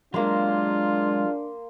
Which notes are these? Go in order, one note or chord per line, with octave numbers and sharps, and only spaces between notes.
F#3 G#3 A#3 D4 F4 A#5 C6